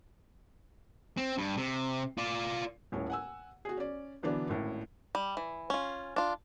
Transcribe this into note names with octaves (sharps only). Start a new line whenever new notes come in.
C4
G2
C3
F4 D5
D#1 A2 C#4 C#5
F#5 G#5 E6
F#4 G#4
C#4 D5
B2 D3 E3 F#3 B3 D4
G#1 A2 C#4
G3
E3
C#4 F4
D4 F4